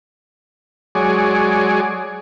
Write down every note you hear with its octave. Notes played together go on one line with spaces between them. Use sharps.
F#3 G#3 G#4 C#5 D5